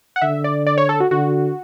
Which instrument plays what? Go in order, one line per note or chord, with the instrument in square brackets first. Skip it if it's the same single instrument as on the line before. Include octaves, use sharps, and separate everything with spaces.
[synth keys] F#5
[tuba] D3 [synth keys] E5
[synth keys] D5
D5
C#5
A4
F#4
[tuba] D3 [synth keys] F#4